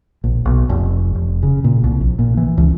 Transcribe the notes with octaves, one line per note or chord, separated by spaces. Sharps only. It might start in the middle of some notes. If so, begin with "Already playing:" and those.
A#1
B1
F1
F1
C#3
A#2
C2
A#1
A#2
E3
C#2